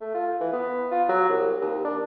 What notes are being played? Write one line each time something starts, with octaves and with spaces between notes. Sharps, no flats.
A3
F4
E3
B3
F4
F#3
C2
D#2
D4